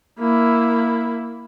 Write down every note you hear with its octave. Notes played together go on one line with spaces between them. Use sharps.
A#3 E4